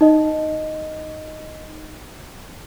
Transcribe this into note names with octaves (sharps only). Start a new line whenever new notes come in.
D#4 D#5